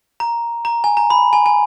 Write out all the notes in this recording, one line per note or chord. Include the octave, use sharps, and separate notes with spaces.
A#5
A#5
G#5
A#5
B5
G#5
G#5